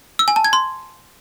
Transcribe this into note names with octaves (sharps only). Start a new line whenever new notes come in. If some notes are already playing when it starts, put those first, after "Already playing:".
E6
G#5
A5
G#6
C6